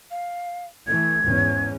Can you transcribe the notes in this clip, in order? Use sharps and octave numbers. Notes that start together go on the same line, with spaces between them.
F5
E3 A3 G#6
E2 G#2 C#4